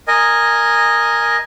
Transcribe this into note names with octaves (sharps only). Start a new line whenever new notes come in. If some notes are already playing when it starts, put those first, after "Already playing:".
A#4 D#5 G#5